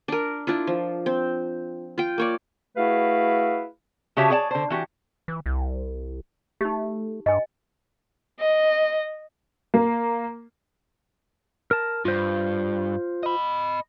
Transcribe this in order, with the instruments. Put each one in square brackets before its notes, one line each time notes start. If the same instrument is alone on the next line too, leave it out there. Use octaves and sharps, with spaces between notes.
[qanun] D4 A#4
D4 E4 F4
F3
C4
F4 G5
A#3 C#5 D5
[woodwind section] A3 E4 F#4 G#4 B4 F5
[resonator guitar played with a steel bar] C#3 F#4 G4 C#5 E5 A5
G#4 C#5 D5 G5 A5
D3 C5
E3 F#4 G4
[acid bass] E3
C2
[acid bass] A3 [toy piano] D#4 G4
[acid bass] G2 [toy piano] D#5 G#5
[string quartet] D#5
[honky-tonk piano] A#3
[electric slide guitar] A#4 A5
[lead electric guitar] G2 [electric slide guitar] F4 C5
[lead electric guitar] D#5 B5